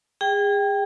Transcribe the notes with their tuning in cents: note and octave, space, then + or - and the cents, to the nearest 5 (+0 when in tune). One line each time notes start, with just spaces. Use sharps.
G#4 -30 G5 +0